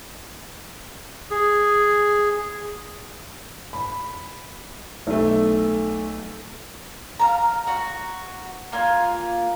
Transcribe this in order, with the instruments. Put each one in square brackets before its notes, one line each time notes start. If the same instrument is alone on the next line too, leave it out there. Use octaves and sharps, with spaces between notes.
[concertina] G#4
[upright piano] B5
B1 A3
[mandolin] F5 A5 A#5
F#4 A#5
A#3 F4 G#5